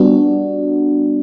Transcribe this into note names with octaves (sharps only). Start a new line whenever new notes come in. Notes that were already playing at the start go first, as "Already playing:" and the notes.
Already playing: G3 B3 D4 F#4